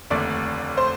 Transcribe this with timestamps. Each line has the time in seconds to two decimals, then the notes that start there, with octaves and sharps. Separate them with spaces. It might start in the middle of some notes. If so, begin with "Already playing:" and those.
0.10 F1 D#2 D3 A3 D4 D5
0.77 C5